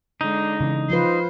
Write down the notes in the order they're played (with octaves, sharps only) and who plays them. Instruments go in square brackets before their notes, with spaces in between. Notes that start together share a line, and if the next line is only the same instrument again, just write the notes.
[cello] D3 G#3 [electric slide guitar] D#4
[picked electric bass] C#3 E3
[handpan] F3 F4 B4 [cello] C5